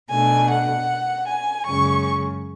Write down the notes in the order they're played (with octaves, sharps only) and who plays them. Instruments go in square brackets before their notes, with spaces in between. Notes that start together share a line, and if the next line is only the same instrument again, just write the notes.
[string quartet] B2 A3 D4 G#5
F#5
G#5
F#2 C#3 G#3 C#4 C#6